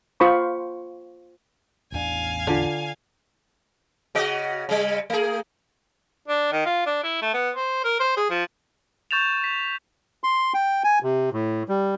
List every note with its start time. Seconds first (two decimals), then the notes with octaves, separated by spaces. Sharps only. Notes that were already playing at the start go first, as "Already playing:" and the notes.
0.20 F4 C5 B5 C#6
1.92 A1 E2 D4 F5 G#5
2.47 D3 F4 D5
4.15 C#3 F#4 D#5
4.69 C#3 G3
5.10 A3 G#4
6.28 D4
6.52 D#3
6.66 F4
6.86 D4
7.03 E4
7.22 A3
7.34 B3
7.56 C5
7.84 A#4
8.00 C5
8.17 G#4
8.30 F3
9.11 C#6 G6 A6 E7 F7
9.44 B6
10.24 C6
10.54 G5
10.84 G#5
11.03 C3
11.33 A2
11.69 G3